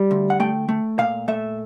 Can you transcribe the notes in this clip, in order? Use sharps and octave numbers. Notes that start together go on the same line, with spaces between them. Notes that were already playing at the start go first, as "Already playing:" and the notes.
Already playing: G3
D2
F#5
A3 G5
A3
A#2 F5
A3 E5